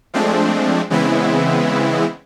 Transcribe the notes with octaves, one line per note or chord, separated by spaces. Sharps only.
F3 G#3 A3 C4 D4
C#3 E3 G#3 B3 C4 E4